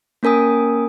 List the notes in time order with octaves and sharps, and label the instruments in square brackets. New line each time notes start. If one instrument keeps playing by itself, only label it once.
[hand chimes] A#3 C#4 A#4 G#5 D#6